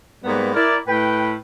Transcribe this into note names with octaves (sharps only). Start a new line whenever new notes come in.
G#2 G3 A#3 B3
E4 A#4 D5
A2 B4 G5